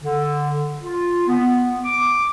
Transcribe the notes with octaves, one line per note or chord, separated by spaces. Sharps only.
D3
F4
B3
D6